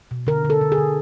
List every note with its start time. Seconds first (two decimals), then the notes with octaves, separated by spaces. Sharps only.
0.11 B2
0.27 D3 A#4
0.45 D3
0.50 A4
0.61 D3
0.72 G#4
0.78 D3